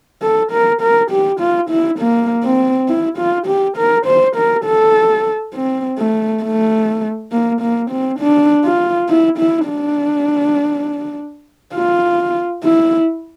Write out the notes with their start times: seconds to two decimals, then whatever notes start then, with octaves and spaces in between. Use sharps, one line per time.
0.22 A4
0.52 A#4
0.82 A#4
1.11 G4
1.40 F4
1.70 E4
2.00 A#3
2.44 C4
2.88 E4
3.18 F4
3.47 G4
3.77 A#4
4.07 C5
4.36 A#4
4.65 A4
5.54 C4
5.98 A3
6.43 A3
7.32 A#3
7.61 A#3
7.91 C4
8.20 D4
8.65 F4
9.09 E4
9.38 E4
9.68 D4
11.75 F4
12.64 E4